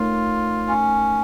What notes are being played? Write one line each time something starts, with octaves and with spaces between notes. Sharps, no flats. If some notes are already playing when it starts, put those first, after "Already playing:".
Already playing: A3 D#4 F4 A#4 C#5
C#4